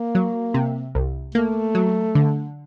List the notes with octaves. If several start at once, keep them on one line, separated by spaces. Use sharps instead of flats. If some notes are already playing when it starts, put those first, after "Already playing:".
Already playing: A#3
F#3
C3
C2
A3 A#3
F#3
D3